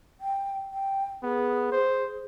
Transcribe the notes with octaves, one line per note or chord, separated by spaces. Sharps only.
G5
G5
B3 G#4
C5